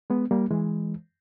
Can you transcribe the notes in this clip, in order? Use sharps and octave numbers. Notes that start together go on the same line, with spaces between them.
G#3 B3
G3 A#3
E3 G#3